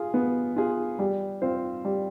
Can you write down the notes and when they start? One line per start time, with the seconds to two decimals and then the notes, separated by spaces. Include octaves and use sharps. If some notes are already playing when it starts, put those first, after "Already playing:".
Already playing: F4 G#4
0.14 B3
0.56 F4 G#4
0.99 G3
1.42 C4 F4 C5
1.85 G3